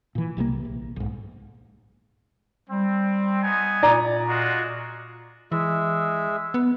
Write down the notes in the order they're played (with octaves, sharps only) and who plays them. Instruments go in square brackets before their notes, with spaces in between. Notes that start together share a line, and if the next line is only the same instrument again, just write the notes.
[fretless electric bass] A#2 E3
C2 C3 E3 A#3
A#1
B1 G#2
[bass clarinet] G3 [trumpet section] C4
[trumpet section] B3 D#4 G#5
[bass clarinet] A#2 [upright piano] D5 A#5
[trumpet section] G#3 F4 F#4
[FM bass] E3 [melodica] G#3 E5
[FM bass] B3